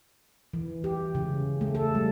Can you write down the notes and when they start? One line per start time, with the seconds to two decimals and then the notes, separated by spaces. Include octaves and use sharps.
0.54 E3
0.84 G4
1.15 C#3
1.61 A3
1.75 A4
1.95 G3